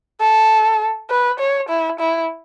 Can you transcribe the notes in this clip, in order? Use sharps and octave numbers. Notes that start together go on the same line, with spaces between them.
A4
B4
C#5
E4
E4